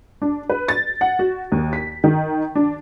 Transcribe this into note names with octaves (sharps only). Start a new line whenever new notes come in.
D4
B4
A6
F#5
F#4
D#2
B6
D#3
D4